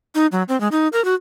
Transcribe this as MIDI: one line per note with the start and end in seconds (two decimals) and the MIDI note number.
0.15 0.26 63
0.32 0.43 54
0.49 0.59 60
0.60 0.68 56
0.72 0.88 63
0.93 1.03 70
1.05 1.14 66